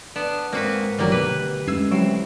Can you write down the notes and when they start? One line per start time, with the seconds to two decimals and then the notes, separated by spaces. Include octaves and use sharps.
0.16 B3 D4
0.53 G#2 A#3 C4 F#4 B4
0.99 G1 D2 D#3 F#3 G3 A#3
1.12 B2 B4
1.67 G#3 A3 C#4 E6 G#6 C7
1.91 D2 F#3 C4 E4 C7